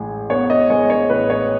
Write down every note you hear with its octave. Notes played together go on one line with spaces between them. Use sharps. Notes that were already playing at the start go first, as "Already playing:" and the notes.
Already playing: A1 G#3
B3 C#5
D#5
G#3 C#5
C#5
A1 B4
C#5